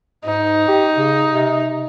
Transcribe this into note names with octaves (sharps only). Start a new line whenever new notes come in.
G#2 D#4
G4
C#3
C3